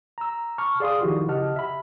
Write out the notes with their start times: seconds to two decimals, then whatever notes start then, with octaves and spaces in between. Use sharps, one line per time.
0.18 A#5 E6
0.58 A5 B5 C#6 D6 F6
0.80 G#4 D5 F5 C6 D#6
1.01 D#3 F3 E4 F#4 G4
1.28 C#3 G4 D#5 F#5 A5 F6
1.56 E5 B5